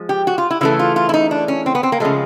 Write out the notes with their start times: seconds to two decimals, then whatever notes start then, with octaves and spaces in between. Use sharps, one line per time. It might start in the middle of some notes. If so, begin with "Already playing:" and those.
Already playing: F3 G#3
0.09 G4
0.27 F#4
0.38 F4
0.51 E4
0.61 C#3 E3 A3 E4
0.79 F4
0.96 F4
1.09 E4
1.14 D#4
1.31 D4
1.48 C#4
1.66 C4
1.75 B3
1.83 C4
1.92 A#3
2.00 C#3 F3 G#3 A3